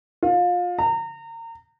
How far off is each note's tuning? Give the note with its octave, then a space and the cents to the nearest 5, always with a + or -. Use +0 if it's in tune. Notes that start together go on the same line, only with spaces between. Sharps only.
F4 +25
A#5 -30